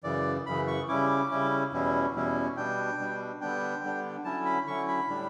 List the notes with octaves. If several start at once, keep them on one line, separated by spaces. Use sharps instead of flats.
F#2 C#3 E3 D5
F#2 C#3 E3 B5
C#6
C#3 G3 C#4 E4 D6
C#3 G3 C#4 E4
E2 B2 G3 C#4 E4
E2 B2 G3 C#4 E4
B2 G3 D4 G5
B2 G3 D4
D3 G3 B3 D4 G5
D3 G3 B3 D4
D3 F#3 C#4 E4 A5
B5
D3 F#3 C#4 E4 C#6
B5
A2 G3 D4